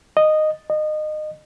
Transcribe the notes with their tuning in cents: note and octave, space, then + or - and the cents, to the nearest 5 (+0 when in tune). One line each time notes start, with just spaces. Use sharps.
D#5 -10
D#5 -25